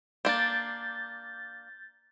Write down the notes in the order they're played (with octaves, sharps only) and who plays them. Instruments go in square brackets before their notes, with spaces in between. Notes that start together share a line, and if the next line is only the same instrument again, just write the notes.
[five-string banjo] A#3 D4 [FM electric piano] G6 A6